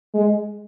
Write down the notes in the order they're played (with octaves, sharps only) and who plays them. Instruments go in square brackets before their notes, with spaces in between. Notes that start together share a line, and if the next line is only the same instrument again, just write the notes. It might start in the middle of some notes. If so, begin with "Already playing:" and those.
[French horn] G#3